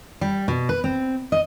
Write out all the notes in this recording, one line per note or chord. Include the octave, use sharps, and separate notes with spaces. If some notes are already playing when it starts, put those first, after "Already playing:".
G3
B2
B4
C4
D#5